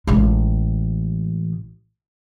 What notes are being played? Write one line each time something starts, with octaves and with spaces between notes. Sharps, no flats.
A1 G#3